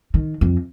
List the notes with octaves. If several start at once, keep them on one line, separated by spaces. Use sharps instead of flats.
D#3
F2